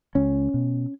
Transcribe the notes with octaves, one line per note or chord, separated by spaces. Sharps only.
C#2 C#4
B2